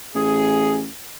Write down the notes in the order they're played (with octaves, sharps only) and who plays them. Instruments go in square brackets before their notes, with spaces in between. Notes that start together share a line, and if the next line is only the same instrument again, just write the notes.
[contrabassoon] A1 [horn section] G#4